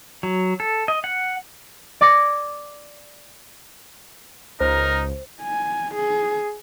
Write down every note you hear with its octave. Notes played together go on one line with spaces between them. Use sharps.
F#3
A4
D#5
F#5
D5 D6 G#6 A#6 C#7
C#2 D#4 A#4 C5
G#5
G#4